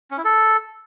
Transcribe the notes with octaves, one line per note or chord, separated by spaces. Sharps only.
C#4
E4
A4